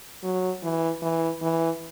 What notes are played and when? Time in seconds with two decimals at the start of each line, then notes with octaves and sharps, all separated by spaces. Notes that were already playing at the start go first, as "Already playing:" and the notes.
0.23 F#3
0.63 E3
1.02 E3
1.42 E3